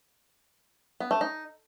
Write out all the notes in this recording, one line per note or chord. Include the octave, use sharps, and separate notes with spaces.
B3
A3
D#4